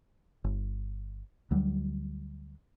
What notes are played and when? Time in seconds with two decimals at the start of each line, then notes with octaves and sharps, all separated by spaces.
0.44 G1
1.51 D2 F#3 G3